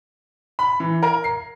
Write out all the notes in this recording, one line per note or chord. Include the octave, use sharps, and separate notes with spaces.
B5
E3
A#4
C7